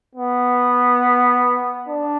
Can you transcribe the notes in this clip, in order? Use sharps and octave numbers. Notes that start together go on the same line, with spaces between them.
B3
D4